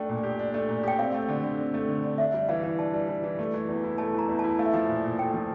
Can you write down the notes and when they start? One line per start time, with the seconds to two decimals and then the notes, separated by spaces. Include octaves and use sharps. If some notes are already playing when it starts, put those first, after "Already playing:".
Already playing: A3 D4 G5
0.09 A#2
0.23 G4
0.39 D4
0.54 A3
0.68 A#2
0.83 G4 G5
0.99 C4 F5
1.14 A3
1.29 D3
1.44 D3
1.59 C4
1.74 A3
1.89 D3
2.04 D3
2.18 D4 E5
2.34 G3
2.49 E3 F5
2.64 E3
2.79 D4 A5
2.94 G3
3.08 E3
3.24 E3
3.39 A3
3.54 E3
3.68 E2
3.84 E4
3.98 A3 A5
4.14 E3 A#5
4.28 E2 A#5
4.39 E4 A5
4.59 A3 F5
4.65 E5
4.74 F3 F5
4.88 A#2
5.03 A#2
5.18 A3 G5
5.34 F3